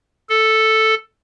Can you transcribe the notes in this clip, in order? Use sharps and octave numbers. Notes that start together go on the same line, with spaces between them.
A4